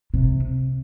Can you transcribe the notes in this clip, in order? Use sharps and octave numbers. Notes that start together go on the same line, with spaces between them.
C3